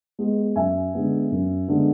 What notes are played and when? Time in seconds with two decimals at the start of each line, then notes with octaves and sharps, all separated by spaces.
0.19 G#3 B3
0.56 F#2 E5 G#5
0.94 D3 G#3 B3
1.32 F#2
1.68 D3 G#3 B3